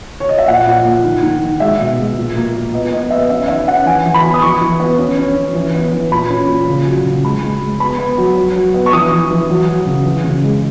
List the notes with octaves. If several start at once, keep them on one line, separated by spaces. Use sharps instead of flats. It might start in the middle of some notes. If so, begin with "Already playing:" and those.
C#5
D#5
E5
A#2 F#5
A#2
A#3
D#3
D#3
D#3
G#3 E5
B2
G#3
A#2
A#3
A#2
B3 D#5
B3 D#5
B3 E5
C#4 E5
D#3 E5
C#4 F#5
E3 G#5
E3
B5
B3
D#6
E3 C#6
E3
B3
C#4
C#4
C#4
E3
B3
E3
A#2 B5
C#4
A#2
C#3
F#3
C#3
G#3 B5
G#3
G#3
B3 B5
B3
F#3
F#3
F#3
B3
C#6
E3 D#6
E3
E3
F#3
F#3
C#3
E3
C#3
G#3